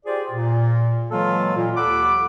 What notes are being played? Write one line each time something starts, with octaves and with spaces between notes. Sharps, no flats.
F4 G4 G#4 C5 D5
A#2
E3 F#3 G#3 A#3 F4 A4
A#2
D#2 A4 F#5 B5 D6